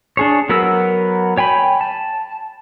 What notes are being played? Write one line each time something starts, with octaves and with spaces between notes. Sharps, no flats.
D4 G#4 C#5
F#3 B3 A#4 B4 E6
C#5 G5 G#5 B5
A5